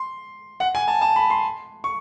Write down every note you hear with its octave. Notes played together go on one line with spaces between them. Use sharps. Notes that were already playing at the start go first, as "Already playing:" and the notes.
Already playing: C6
F#5
G#5
A5
A5
B5
C6
C#6